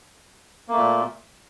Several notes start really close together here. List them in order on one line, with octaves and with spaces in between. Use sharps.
A#3 A3 A#2